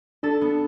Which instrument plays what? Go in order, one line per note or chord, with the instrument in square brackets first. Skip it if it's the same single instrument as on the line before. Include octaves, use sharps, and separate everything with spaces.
[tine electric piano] D4 [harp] A4
[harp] B3